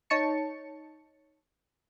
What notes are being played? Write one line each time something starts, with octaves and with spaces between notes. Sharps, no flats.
D#4 C#5 A5 C#7